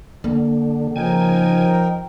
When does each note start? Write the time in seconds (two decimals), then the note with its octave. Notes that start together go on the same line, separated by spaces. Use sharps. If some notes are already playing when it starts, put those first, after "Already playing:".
0.24 D3 A#3
0.96 C#3 F3 D#4 A#4 G5 G#5